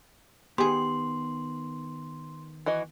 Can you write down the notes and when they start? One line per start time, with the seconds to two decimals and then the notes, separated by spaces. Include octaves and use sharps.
0.58 D#3 B3 G4 G#4 C6
2.66 E3 F#4 D#5